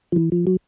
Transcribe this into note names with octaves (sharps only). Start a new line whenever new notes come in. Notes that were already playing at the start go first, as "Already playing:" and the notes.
F3
E3
F3
F#3